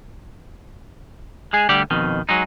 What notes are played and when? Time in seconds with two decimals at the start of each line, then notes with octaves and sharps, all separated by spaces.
1.53 G#3 G#4
1.69 D2 D3 G3 G4 D5
1.91 F2 B2 D#3
2.29 F#3 G#3 D#4